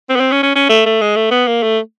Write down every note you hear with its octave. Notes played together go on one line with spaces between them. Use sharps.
C4
B3
C4
C#4
C#4
C#4
A3
A3
G#3
A3
B3
A#3
A3